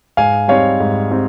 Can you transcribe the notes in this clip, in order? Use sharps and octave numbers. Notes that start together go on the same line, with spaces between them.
G#2 F5 G#5
G3 C4 D#4 C#5 F5
G#2
G3 C4 D#4